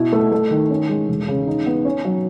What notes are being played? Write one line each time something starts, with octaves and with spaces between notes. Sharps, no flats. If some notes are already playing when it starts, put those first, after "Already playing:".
Already playing: B2 E4
A3
A3
D#3
C#4
G#3
E1
C#3
D#4
B3
C#4
F#3